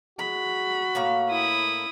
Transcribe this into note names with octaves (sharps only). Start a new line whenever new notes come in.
G#3 F#4 B5
A2 A#3 F5
E4 D#6